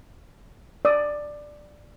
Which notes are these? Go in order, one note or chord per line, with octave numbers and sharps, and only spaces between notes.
D5 D#6